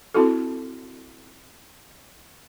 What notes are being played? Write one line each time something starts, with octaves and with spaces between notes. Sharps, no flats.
C4 E4 F#4 A4